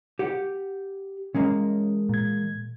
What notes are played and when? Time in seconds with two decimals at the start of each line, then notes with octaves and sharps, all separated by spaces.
0.19 G4 F#5
1.35 E3 G#3 A#3 C#4
2.09 A#2 G#6